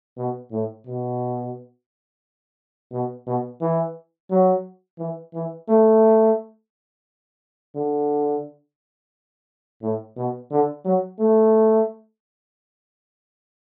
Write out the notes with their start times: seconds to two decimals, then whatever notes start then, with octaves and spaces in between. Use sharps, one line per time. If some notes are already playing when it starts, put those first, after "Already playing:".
0.17 B2
0.52 A2
0.87 B2
2.92 B2
3.27 B2
3.61 E3
4.31 F#3
4.99 E3
5.34 E3
5.69 A3
7.75 D3
9.82 A2
10.17 B2
10.51 D3
10.85 F#3
11.19 A3